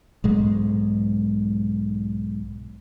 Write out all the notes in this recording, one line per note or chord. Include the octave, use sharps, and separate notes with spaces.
B1 G#2 G#3